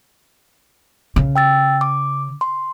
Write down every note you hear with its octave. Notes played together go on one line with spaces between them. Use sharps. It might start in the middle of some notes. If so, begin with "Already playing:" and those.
C#3
G5 E6 A6
D6
C6